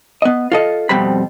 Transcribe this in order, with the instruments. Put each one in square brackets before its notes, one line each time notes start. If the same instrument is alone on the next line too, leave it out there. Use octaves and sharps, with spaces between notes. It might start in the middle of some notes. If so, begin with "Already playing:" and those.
[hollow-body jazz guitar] B3 D#5
F4 A4 D#5
F2 B2 G3 C4 B5